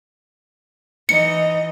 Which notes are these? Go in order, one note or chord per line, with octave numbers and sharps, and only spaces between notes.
E3 D#4 D#5 C#7